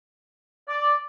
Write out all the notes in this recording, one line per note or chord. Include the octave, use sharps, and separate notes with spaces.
D5